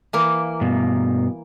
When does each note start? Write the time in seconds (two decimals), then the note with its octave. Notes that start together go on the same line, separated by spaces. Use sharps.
0.13 E3 A#3
0.61 G2 B2